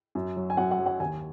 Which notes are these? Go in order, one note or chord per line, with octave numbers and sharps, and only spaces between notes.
F#2
F#3
G#5
F#2 F#5
F#5
F#3
F#5
D#2 G#5